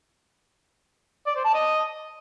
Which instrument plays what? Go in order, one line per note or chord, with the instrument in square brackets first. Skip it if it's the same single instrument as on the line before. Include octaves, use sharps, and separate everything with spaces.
[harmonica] D5
C5
A5
D#5